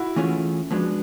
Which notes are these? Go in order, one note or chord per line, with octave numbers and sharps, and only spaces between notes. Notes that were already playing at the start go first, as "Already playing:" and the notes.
Already playing: E4 F#4
E3 A3 C#4 F4 G#4
F3 G#3 B3 D4 F#4